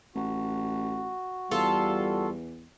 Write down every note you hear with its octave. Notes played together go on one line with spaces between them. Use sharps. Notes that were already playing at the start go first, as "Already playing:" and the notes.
A1 F#4
E2 G3 F4 A4